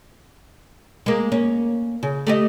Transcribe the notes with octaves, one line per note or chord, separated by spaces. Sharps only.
G#3 A#3
A#3 C#4
C#3
A3 G4 D#5